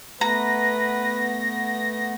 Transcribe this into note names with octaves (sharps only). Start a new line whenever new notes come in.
A3 B3 B4 A#5 A#6